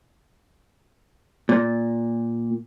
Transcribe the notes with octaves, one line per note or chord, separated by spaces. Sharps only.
A#2